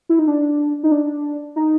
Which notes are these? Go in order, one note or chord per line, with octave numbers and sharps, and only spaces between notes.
E4
D#4
D4
D#4
D4
D#4